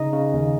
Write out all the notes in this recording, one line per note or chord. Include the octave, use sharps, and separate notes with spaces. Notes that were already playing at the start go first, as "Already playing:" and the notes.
Already playing: C#3 D#4 D#5
C#3
D#2